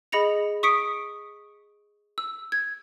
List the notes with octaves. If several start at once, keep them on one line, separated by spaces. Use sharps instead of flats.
G#4 D#5 B5 A#6 C#7 F7
C#6 D#6 B6 C#7 D7
E6
G#6